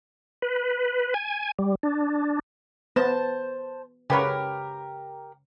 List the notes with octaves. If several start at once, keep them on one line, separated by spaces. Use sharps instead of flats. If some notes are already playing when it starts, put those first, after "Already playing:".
B4
G#5
G3
D4
B3 C5 A5
C#3 G4 A#4 B4 C#5